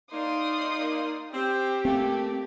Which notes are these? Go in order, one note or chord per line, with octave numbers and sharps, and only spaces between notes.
A#3 D#4 D5 C6 D#6
C4 G4
A3 A#3 C4